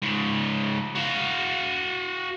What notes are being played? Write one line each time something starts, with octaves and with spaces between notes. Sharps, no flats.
G#2 C#3
F#4 F5